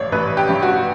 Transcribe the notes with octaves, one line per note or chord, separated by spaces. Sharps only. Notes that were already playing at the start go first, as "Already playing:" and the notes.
Already playing: A1 G2 C#5 D5
A1 B4
G4
G2
F#4